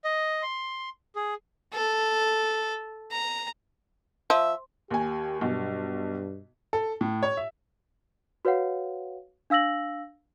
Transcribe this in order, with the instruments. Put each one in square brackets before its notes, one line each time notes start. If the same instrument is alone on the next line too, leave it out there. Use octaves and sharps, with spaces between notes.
[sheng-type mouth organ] D#5
C6
G#4
[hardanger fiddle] A4
A#5
[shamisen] F3 [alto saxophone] E5
[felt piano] D#2 G#5 [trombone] G4
[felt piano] B1 [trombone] G2
[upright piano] A4
A2
C#5
E5
[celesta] F#4 B4 C#5 F5 F#5
D4 F5 E6 A#6 F#7